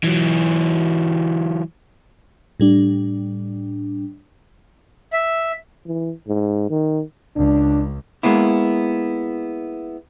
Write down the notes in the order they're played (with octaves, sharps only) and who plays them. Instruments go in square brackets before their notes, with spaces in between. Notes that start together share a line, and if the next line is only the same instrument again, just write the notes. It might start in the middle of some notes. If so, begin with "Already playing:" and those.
[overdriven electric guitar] E3 F#3
[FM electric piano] A2 G3 D4
[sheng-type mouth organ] E5
[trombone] E3
G#2
D#3
[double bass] C#2 [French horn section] D4
[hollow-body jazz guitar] G#3 A#3 B3 E4